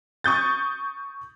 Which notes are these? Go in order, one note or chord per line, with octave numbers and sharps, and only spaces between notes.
C#6 D#6 G6 A6